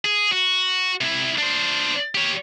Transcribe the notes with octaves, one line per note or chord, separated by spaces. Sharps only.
G#4
F#4
C3 E4
D4 C5
G4 C#5